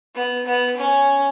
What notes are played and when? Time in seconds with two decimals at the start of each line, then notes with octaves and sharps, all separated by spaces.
0.15 B3
0.46 B3
0.77 C#4